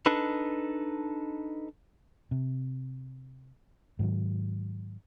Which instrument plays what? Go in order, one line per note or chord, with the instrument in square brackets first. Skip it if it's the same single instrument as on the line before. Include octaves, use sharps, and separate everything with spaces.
[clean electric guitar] D4 D#4 A4 B4
[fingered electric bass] C3
G#2 D#3 F#3